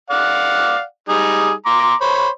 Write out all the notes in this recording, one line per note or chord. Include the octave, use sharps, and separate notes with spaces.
D5 F5 F#5
G3 D#4 G#4
A#5 C6 D6
C5 C#5 B5